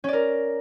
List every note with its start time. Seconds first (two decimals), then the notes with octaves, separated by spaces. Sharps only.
0.04 C#4
0.08 D5
0.13 A#4